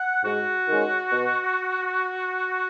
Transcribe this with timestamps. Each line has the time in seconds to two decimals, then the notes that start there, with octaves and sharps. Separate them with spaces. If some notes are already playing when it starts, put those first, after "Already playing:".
Already playing: F#5
0.24 G#2 F#4
0.68 D#3 G#3 C#4
1.11 B2